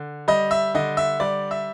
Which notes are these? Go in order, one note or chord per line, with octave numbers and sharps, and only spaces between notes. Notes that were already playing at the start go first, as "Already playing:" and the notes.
Already playing: D3
G3 D#5
E5
D3 D#5
E5
G3 D5
E5